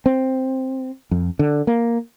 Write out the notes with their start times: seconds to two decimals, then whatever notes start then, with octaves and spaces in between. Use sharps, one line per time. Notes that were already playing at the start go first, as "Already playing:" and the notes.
0.06 C4
1.11 F2
1.39 D3
1.67 A#3